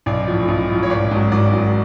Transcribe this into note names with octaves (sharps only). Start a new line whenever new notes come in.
B1 D5
A2 F3
B1
A2 F3
C#5
G#1 D5
G#2 F#3
G#1 D5
G#2 F#3